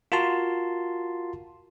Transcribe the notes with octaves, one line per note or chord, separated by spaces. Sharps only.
F4 F#4 A#4 A5 C6